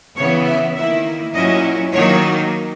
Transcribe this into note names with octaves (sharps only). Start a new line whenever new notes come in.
C#3 E3 B3 C#5
E5
D#3 A#3 E4 E5
A#2 F#3 C#4 E4 D#5
D#3 F#3 A#3 D#4 C#5